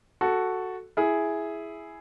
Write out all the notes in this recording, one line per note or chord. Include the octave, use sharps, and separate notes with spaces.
F#4 A4
E4 G#4